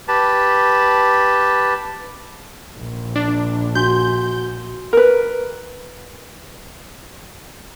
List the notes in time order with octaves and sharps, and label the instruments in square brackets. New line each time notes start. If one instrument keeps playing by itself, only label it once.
[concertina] G4 B4 A5
[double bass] A#1
[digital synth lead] D4
[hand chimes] F#4 G#5 C6 [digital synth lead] G6
[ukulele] A#4 B4